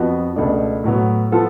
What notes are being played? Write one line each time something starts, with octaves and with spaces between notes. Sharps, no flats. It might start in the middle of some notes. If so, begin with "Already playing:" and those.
Already playing: F2 F3 B3 F#4
C#2 B2 A3 D4
A2 F#3 B3
F3 B3 F4 A4